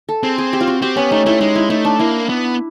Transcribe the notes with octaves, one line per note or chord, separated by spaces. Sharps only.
A4
C4 G#4
G#4
G4
F4
F#4
C4 G4
B3 C#4
A3 D#4
A3 E4
G#3 D#4
E4
A3 D#4
D4
A#3 E4
B3